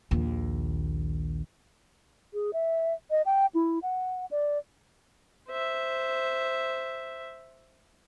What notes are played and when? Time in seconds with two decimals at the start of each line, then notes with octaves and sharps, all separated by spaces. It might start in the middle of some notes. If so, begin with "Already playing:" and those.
0.11 A#1 D#2
2.34 G#4
2.53 E5
3.11 D#5
3.26 G5
3.55 E4
3.82 F#5
4.31 D5
5.49 C5 E5